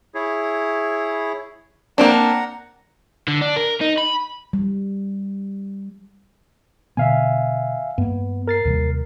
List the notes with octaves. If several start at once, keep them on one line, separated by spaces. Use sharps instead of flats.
E4 G#4 C#5
A#3 C4 D4 F#5 A#5
D3
D4
A#4
D#4
B5
G3
B2 D3 B3 E5 F5 G#5
G2 A#3 B3
A#4 A6 C7
D#2 C3 G3